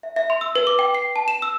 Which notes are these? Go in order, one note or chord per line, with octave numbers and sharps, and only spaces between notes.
E5
E5
C6
E6
B4
D6
G5
C7
A5
E7
E6